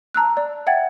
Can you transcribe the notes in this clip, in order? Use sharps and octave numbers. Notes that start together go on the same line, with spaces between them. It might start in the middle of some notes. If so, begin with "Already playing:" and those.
A5 A#5 E6 F#6
D5
E5 F#5 G5 G#6 A6